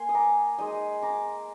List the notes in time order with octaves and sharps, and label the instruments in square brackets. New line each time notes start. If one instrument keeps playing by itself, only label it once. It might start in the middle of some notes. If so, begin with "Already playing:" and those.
Already playing: [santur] A#3 G#5 C6
D#6
A#5 D6
G#3 D#4 C6 D#6
A#5 D6